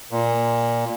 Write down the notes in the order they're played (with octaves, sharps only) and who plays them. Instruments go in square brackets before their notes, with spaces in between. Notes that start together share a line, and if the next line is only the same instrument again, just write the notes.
[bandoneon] A#2